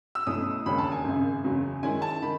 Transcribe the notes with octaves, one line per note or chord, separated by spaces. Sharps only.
E6
B1 B2 A3 C#4 E4 D#6
E1 D#2 C#3 G#3 C#4 B5
A5
G#5
G#1 F#2 C#3
F#1 E2 C#3 F#3
F#2 D#3 G#3 C#4 E4 G#5
A5
D#3 B5